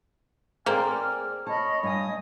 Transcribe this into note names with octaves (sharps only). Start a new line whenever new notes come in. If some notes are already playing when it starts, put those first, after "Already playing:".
A#3 C4 G#4 A#4 D5 G#5 F6
C#5 D#5 A5 B5
G2 D#5 G#5 D#6